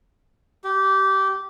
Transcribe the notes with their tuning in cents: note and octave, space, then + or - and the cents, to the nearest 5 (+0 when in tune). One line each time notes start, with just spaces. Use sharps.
G4 -20